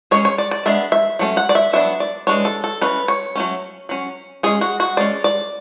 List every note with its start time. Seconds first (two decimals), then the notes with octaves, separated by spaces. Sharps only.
0.11 G#3 C#4 C#5
0.25 C#5
0.38 D5
0.51 D5
0.66 G#3 B3 D4 E5
0.92 E5
1.19 F#3 A3 C#4
1.37 F#5
1.49 D5
1.55 E5
1.73 F#3 B3 D4 E5
2.00 D5
2.27 E3 G#3 D4 C#5
2.45 A4
2.64 A4
2.82 E3 G#3 C#4 B4
3.08 C#5
3.36 F#3 A3 C#4
3.89 F#3 C#4
4.43 G#3 C#4 G#4
4.61 F#4
4.80 F#4
4.97 G#3 C#4 D5
5.24 D5